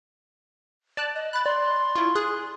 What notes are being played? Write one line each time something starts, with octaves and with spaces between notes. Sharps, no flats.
D5 A5 F#6
D#5
B5 F#6 A6
D5 C6
E4 F4 C#6
G#4 F#6